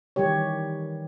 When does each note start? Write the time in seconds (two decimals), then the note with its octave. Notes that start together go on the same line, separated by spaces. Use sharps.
0.16 D#3 E3 G3 G4 C#5